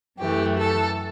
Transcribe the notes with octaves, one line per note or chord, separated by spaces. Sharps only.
F#2 E3 A3 G4
A4